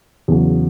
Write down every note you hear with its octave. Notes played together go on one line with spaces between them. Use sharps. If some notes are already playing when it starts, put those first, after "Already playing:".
E2 C#3 F#3